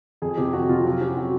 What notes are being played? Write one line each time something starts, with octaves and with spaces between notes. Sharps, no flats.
F2 G#4
C3 G4
F2 F#4
C3 F4
F#3
C#4 G4
F#3 F#4